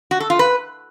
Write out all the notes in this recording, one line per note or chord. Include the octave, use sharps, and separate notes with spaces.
F#4
A4
F4
B4